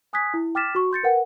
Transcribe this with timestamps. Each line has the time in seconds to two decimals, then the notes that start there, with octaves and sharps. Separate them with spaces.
0.13 G#5 D#6 F#6 G#6 B6
0.34 E4
0.55 G5 D6 F6 A6 B6 E7
0.75 F#4 C#6
0.91 C6 G6 A6 C#7
1.03 A#4 B4 F#5 G5